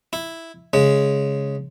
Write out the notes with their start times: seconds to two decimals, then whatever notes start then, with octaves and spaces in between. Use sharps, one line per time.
0.13 E4
0.73 C#3 G#3